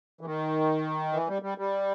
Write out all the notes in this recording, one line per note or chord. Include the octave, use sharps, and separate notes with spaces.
E3
D#3
E3
G3
G3
G3